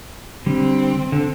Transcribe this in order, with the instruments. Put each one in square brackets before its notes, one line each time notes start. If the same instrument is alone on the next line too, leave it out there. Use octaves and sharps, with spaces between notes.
[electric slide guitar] D3 G3 [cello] C4
[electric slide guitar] D3